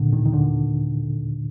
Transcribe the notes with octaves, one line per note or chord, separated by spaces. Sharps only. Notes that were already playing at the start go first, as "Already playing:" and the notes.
Already playing: D2 A#2 D3
D#2 D#3
D#3
D2 D3